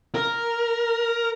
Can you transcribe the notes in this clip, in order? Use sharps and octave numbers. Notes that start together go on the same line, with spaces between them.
A#4